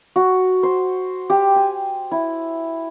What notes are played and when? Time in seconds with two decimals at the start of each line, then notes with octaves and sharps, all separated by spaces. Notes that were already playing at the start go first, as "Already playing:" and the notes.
0.16 F#4
0.63 C5
1.30 G4
1.56 G#5
2.11 E4